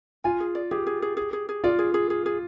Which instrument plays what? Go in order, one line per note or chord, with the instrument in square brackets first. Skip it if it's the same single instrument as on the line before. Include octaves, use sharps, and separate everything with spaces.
[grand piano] F4 [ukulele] G#5
[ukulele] G#4
D5
[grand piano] G4 [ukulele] G#4
[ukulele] G#4
G#4
G#4
G#4
G#4
[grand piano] F4 [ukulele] D5
[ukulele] G#4
G#4
G#4
G#4